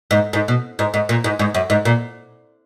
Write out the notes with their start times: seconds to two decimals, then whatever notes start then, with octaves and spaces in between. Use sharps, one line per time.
0.11 G#2
0.33 G#2
0.48 B2
0.79 G#2
0.94 G#2
1.09 A#2
1.24 G#2
1.39 G#2
1.54 F#2
1.70 G#2
1.85 A#2